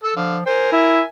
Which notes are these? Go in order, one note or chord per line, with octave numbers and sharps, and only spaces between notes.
A4 E6
D3 F3 F5
A#4 C5 G#5
E4 E5